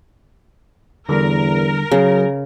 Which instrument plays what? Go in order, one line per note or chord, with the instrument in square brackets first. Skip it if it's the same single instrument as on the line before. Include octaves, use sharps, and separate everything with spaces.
[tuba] E2 [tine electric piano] D3 G3 D4 [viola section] A#4
[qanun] C#3 [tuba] F#3 [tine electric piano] G#4